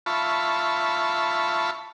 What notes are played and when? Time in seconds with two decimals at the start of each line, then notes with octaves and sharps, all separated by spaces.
0.06 F4 E5 A5 B5 C#6